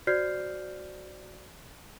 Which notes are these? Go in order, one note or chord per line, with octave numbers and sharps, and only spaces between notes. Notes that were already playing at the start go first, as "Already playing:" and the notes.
F#4 C5 D5 F6 G6 C7